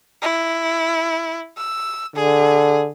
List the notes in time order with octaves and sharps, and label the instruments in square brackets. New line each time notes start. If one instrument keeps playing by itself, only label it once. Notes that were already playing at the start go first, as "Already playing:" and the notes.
[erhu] E4
E6
[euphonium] D3 [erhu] G#4